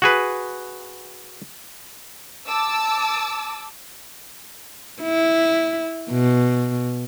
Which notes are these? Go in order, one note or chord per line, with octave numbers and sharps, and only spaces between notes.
F#4 G#4 B4
A5 D6 E6
E4
B2